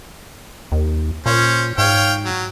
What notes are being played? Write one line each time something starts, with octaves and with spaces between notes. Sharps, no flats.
D#2
A#2 C#4 C5
G#2 C#5 F5 G5
F#3